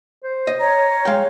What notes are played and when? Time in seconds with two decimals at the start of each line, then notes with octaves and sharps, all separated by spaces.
0.23 C5
0.47 D#5
0.60 C#5 A#5
1.05 G#3 F5 G5